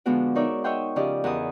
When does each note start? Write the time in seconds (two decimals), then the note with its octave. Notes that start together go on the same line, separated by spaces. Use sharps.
0.06 D3 F3 G#3 B3 F#4 D5
0.35 D#4 A#4 C#5 D5 E5
0.64 C#5 D#5 E5 F#5 G5 C6
0.96 C#3 F3 G4 D5 D#5
1.24 E2 A#4 F#5 G#5 D#6